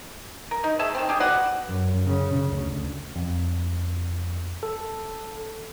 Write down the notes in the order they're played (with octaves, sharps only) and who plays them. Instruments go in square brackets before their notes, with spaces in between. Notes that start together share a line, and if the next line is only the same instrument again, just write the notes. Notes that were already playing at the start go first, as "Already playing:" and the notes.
[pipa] A#4
D#4
A3 G#4 E5 A5
D#3 A3 C4
G3 D4 G4 G#4
F#4 B4 D5 F#5
[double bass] F#2
C#3
D2
[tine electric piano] F2
A4